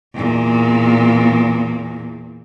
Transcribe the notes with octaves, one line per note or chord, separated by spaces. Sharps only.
E2 A#2